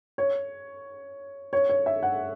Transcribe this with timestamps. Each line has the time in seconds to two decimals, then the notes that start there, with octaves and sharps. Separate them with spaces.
0.18 C#5
1.53 C#5
1.69 C#5
1.86 E5
2.03 F#5